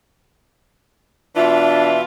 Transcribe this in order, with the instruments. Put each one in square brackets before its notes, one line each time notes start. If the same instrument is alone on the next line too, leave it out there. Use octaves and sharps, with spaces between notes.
[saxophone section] B2 E3 F4 [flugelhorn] D4 [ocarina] E5